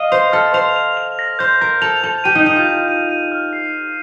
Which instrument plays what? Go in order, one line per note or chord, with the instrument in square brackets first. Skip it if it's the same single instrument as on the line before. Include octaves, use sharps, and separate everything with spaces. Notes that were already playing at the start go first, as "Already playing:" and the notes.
Already playing: [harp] D#5 F5 [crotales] A#6
[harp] C5 [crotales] F7
[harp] A4 [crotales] F6
[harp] C5 [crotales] F7
[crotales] F7
F7
A#6
[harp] C5 [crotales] G6
[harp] A#4 [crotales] A#6
[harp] A4 [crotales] F7
[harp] A4 [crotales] F7
[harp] G4 [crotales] D#7
[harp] D#4
[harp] D#4 [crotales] D#7
[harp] F4
[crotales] D#7
D#7
D#7
F6
C7